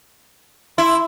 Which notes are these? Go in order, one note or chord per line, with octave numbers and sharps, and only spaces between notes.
E4 C6